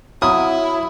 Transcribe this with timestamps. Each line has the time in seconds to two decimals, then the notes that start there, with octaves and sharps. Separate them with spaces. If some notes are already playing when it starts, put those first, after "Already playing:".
0.22 F#3 E4 D#6